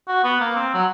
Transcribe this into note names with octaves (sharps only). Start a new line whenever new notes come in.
F#4
B3
A#3
C4
F#3